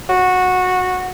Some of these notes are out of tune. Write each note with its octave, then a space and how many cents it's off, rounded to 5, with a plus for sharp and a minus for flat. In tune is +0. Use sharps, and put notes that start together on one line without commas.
F#4 -15